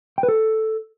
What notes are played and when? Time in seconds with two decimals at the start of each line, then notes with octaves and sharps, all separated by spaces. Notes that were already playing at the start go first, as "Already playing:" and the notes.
0.18 G5
0.23 B4
0.28 A4